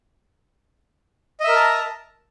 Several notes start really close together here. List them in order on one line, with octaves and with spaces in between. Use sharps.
D#5 E5 A#4 A#5 A5